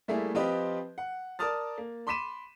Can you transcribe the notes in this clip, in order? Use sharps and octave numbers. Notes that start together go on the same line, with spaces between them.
G3 A3 A#3 E4 G#4
F3 C4 F4 G4 B4 D#5
F#5
A#4 D5 A5 D#6 F6 A6
A#3
B5 C6 D6 B6 D#7 E7